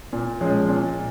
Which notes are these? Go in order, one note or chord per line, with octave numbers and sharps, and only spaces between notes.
A#2
F3 G#3 C#4
A#2